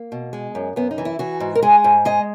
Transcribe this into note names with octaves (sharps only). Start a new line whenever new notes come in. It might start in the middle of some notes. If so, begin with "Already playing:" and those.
Already playing: A#3
B2
G#3
F#2
F#2 B3
D#4
E3
E4
E3 F#4
G#2
A#4
G#3 G#4
G#2
G#3 D#5